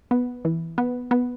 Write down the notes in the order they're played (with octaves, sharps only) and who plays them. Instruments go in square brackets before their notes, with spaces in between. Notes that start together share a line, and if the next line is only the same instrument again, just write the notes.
[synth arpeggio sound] B3
E3
B3
B3